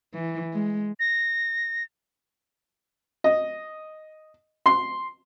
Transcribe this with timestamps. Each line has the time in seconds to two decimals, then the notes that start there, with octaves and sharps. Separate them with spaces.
0.14 E3
0.53 G#3
0.99 A#6
3.24 D#5
4.66 C6